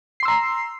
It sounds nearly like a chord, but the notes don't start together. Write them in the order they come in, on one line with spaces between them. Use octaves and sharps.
C7 C6 E6 A#5